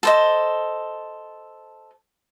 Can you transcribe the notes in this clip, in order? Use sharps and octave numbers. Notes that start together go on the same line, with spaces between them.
A4 C5 D#5